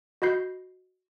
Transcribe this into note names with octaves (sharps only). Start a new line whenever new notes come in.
F#4 D#5 B5 G6 C7